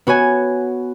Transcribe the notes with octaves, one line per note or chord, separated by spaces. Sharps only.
B3 F#4 C#5 G#5